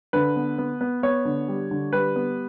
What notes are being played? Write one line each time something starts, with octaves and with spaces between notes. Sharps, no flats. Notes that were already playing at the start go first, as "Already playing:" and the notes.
D3 B4
B3
B3
B3
B3 C#5
D3
G3
D3
G3 B4
B3